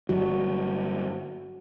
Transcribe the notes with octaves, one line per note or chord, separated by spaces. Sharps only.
G1 F#3 G3 F#4